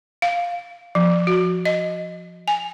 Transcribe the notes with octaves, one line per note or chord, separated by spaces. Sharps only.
F5
F3
F#4
D#5
G#5